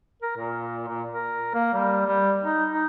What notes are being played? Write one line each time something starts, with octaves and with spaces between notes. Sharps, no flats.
A#4
A#2
A#2
A#4
A#3
G3
G3
D#4
D#4